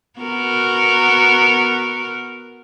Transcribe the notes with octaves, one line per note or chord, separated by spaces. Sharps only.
B3 F#4 A#4